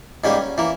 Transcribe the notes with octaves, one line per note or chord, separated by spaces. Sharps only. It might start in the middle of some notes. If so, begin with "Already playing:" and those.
G#2 G3 A#3 C#4
E3 A#3